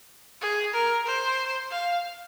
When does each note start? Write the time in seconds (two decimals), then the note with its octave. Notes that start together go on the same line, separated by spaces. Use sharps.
0.41 G#4
0.73 A#4
1.06 C5
1.71 F5